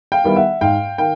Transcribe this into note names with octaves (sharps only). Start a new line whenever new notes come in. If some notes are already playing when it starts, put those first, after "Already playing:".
F5 G5
D#3 G3 B3 E4
E5 F#5
G#2 F5 G5
D#3 F5 G5